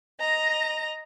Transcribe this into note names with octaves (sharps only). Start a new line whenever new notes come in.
D#5 A#5